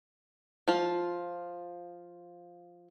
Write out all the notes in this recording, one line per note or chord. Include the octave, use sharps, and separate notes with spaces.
F3 F4